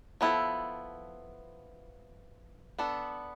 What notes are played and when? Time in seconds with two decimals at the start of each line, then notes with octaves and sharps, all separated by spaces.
0.21 F3 B3 E4 A4
2.79 B3 D4 A4